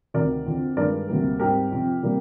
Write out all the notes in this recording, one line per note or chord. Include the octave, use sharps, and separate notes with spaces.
D2 C3 D#3 A#4 D5
F2 D3 F3 C4
G2 D#3 G#3 A#4 D5
D2 C3 G3 A#3
G#2 G3 C4 G4 A#4
F2 C3 F3
C3 G3 A#3